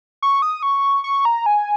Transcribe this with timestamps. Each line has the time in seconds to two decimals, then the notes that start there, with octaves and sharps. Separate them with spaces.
0.22 C#6
0.42 D#6
0.63 C#6
1.04 C#6
1.25 A#5
1.46 G#5